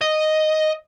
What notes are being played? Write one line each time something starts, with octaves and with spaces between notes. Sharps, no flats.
D#5